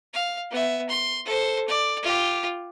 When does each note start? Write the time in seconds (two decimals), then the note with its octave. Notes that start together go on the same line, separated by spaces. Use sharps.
0.13 F5
0.51 B3 E5
0.89 C6
1.25 A4 C5
1.68 D5
2.02 F4 G4